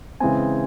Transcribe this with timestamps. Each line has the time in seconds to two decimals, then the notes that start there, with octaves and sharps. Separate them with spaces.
0.20 C#3 E3 G#3 C4 G#5